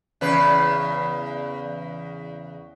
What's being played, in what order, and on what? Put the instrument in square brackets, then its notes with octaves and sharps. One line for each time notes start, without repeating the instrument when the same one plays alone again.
[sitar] E2 C#3 B4